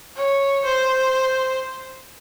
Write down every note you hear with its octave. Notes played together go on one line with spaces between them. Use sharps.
C#5
C5